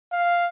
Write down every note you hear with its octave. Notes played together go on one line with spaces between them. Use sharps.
F5